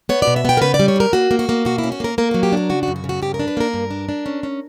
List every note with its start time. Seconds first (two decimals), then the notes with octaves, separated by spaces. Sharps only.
0.09 B3 C#5
0.22 B2 D5
0.36 E5
0.45 B3 G5
0.57 A#4
0.62 C#3 B4
0.74 D5
0.79 G3
0.88 C#5
0.96 C#3 A#4
1.13 A#3 F#4
1.31 A#3
1.39 F#4
1.49 A#3
1.65 B2 F#4
1.78 E4
1.84 C#4
1.92 F#4
2.00 A#3 A#4
2.18 A#3 A#4
2.31 F#3 F#4
2.43 G4
2.52 D4 A#4
2.69 C#3 F#4
2.83 F#4
2.88 F#2
2.96 F#4
3.04 C#3
3.09 F#4
3.22 G2 G4
3.34 A#4
3.40 D4
3.48 B4
3.57 A#3 A#4
3.74 G2
3.91 D4
4.09 D4
4.26 C#4
4.43 C#4